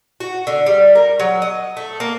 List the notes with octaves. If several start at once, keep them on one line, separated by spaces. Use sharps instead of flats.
F#4
D3
G3
A#4
F#3
D#5
A3
A#3